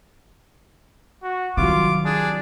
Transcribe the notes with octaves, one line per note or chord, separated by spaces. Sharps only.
F#4
C2 D#3 F#3 F4 D6
D4 G#4